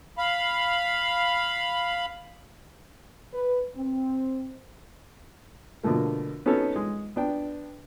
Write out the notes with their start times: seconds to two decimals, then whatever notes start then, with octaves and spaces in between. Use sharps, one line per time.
0.18 F5 B5
3.33 B4
3.75 C4
5.83 B2 D3 F3 A3 A#3
6.46 B3 C#4 D#4 F#4 A4 C#5
6.76 G#3
7.16 B3 D4 G5